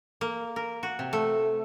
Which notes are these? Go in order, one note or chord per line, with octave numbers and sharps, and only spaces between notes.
A#3
A#4
F#4
C3
A3